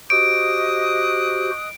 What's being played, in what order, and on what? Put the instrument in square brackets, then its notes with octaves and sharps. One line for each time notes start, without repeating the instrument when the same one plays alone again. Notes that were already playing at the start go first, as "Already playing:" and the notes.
[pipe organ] F#4 G4 C5 [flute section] D#5 D#6 F#6 [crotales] D7